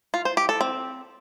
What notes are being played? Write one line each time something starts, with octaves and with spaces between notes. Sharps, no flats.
F4
C5
G4
A4
C4